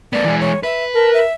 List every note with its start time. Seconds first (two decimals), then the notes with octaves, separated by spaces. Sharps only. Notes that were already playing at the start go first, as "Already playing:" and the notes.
0.13 A3 B3 D5
0.25 E3 G#3
0.41 C#5
0.63 B4 E5
0.95 A#4 A5
1.14 E5